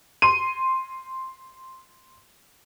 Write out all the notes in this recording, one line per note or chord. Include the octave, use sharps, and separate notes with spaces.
C6 D#7